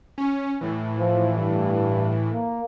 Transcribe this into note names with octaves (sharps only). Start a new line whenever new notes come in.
C#4
A2 E3
F3
G2
A#3